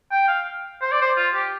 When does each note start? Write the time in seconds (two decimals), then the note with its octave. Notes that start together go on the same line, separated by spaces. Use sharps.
0.11 G5
0.28 F5
0.82 C5
0.92 D5
1.02 C5
1.17 F4
1.34 G4